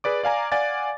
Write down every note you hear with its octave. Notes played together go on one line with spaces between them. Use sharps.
G#4 B4 D5 D6
D5 F5 G#5 A#5
D5 F5 F#5 G#5 A6